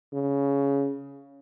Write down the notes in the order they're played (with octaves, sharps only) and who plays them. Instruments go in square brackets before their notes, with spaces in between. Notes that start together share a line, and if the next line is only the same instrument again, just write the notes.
[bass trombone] C#3